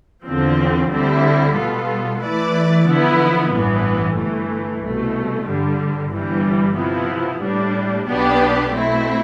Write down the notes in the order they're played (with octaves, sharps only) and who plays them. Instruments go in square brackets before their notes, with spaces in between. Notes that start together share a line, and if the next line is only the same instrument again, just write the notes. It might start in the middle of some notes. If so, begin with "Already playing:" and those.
[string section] E2 D3 F3 C4
D2 D3 G3 C4 E4
B2 G3 B3 F4 A4
E3 A3 E4 B4 D5
D3 F3 B3 E4
A1 G2 E3 B3
G1 G2 E3 A3
C2 B2 A3
G2 D3 G3
G1 G2 E3 G3
C3 F3 B3 E4
A2 G3 D4
B1 B2 B3 D4 G4
B2 A3 C4 E4